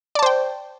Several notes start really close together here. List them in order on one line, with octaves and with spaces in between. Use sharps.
D5 A5 C5 G5